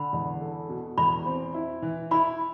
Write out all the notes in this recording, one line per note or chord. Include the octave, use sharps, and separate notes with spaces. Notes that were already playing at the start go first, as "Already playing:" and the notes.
Already playing: D3 B5
E2
A4
B2
E2 B5
C4
E4
E3
E4 B5